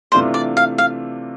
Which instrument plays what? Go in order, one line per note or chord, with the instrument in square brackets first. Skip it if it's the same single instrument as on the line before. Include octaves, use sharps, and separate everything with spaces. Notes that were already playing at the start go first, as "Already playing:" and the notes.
[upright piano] C3 E3 A3 D4 F4 [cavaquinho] C5
[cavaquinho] D5
F5
F5